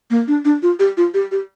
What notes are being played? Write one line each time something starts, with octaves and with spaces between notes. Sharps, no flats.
A#3
D4
D4
F4
G4
F4
G4
G4